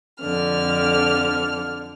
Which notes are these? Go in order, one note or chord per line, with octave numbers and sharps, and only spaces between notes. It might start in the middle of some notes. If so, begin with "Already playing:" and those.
F2 D3 F6